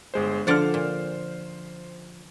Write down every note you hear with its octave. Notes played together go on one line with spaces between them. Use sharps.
G1 G#3 C5
D3 F3 C5 D5 F#5 F6
A#2